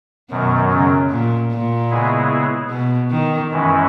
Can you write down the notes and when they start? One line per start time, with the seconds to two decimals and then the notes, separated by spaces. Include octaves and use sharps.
0.30 F#2 B2 D#3 F#3
0.70 C#3
1.10 A#2
1.51 A#2
1.91 C#3 G#3 B3 E4 G#4
2.70 B2
3.10 D#3
3.50 F#2 E3 G#3 C#4 E4